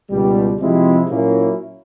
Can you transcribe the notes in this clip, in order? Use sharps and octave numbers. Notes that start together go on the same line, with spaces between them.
C#2 B2 G3
C3 F3 G#3 C4 E4
A#2 F#3 A#3 C#4 E4